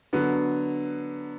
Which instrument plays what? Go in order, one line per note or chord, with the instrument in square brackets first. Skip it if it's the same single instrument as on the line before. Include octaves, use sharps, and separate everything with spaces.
[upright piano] D3 F#3 B3